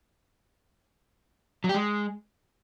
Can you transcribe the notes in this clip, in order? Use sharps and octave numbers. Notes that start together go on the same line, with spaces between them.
F#3
G4
G#3